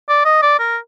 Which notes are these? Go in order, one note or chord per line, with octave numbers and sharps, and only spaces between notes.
D5
D#5
D5
A#4